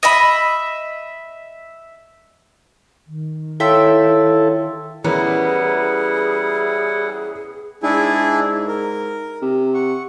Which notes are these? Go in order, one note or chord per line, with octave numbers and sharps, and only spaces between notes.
D#5 E5 B5
D#3
E4 A4 C#5 E5 F5 G5 C6
E3 G3 B3 C#4 E4 G#4 A#4 F#5
G#2 D4 E4 G#4
A#4
C3
F#5 C#6